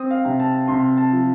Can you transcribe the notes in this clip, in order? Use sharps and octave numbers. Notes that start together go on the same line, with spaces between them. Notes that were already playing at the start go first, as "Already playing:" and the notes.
Already playing: C4 D#6
F5
C3
A5
C3 C6
A5
F3